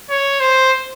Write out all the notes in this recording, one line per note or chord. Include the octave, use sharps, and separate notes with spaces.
C#5
C5